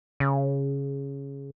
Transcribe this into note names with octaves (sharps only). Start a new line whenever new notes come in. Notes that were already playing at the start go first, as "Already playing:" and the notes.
C#3